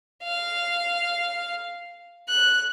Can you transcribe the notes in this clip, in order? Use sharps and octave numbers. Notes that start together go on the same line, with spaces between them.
F5
F#6